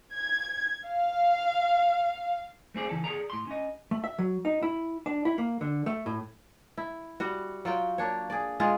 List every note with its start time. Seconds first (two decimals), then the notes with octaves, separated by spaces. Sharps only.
0.14 G#6
0.87 F5
2.75 A3 C4 G#4 D5
2.89 C#3 E3 A4
3.04 G#4 A4 D5 A#5
3.30 A2 C6
3.47 C#4 D#5
3.91 A3
4.04 E5
4.19 F#3
4.45 D#4
4.63 E4
5.06 D4
5.25 E4
5.38 A#3
5.61 D3
5.86 A3
6.06 A2
6.77 E4
7.20 G3 F#4
7.65 F#3 F4 G5
7.98 A#3 D4 C#5
8.30 G#4 D5
8.60 G#3 F4 G#4